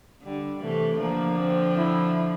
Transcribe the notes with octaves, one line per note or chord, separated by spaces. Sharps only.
D3 G3
C3 E3 A3
D3 F3 A#3
C4
E4